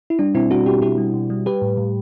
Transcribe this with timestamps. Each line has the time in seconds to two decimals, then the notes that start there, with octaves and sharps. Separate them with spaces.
0.10 E4
0.19 G3 D4
0.34 B2 C4 E4
0.51 G3 D4 F#4
0.66 B2 E4 G4
0.82 B2 E4 G4
0.98 G3
1.14 B2
1.30 G3
1.46 G3 G4 B4
1.62 A2
1.77 A2